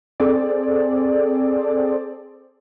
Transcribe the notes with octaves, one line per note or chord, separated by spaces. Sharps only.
C4 G#4 A4 D5